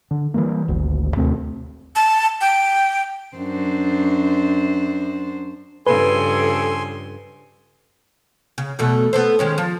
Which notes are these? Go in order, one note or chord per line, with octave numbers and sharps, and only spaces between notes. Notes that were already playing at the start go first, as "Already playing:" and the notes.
D3
E3 G3 A#3
G#1 D2
D#2 C3 A3 C4
A5
G5
F#2 D4 C5
G2 C#3 F3 A4 B4 G#5 C6
C#3
E2 B2 A3
B3 A4 C5
D#3 G#3 C#4
F3